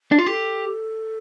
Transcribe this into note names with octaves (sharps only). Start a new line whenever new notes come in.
D4
F4
G4 A4